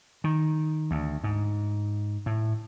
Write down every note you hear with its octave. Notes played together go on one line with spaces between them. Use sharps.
D#3
D2
G#2
A2